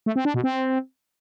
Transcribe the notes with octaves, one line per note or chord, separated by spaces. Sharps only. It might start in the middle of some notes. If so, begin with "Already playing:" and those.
A3
C4
D4
B2
C4